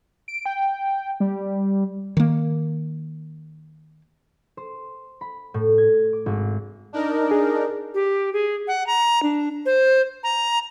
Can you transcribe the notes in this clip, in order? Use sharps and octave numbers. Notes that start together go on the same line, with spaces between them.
D7
G5
G3
D#3 A#3
C5
B5
A2
G#6
D6
G#1
D4 D#4 A#4
G#4
G4
G#4
F#5
A#5
D4
C5
A#5